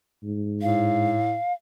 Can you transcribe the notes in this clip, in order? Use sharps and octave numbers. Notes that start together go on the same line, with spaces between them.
G#2
A2 F5